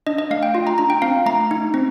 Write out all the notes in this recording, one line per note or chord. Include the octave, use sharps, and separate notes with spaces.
D4 D#5
D#5
A3 F5
G5
F4
A#5
D4 A#5
G5
C4 F5
A3 A#5
D#4
C4